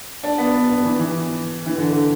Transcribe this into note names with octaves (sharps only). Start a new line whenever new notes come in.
D4
B3
D4
B3
E3
E3
E3
D3
D3